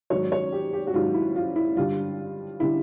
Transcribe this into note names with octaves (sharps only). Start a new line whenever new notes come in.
G#2 D#3 F#3 C#5
C#5
G4
G4
F#4
G#2 D#3 F#3 F4
E4
F4
E4
G2 D3 G3 F4
D3 G3 E4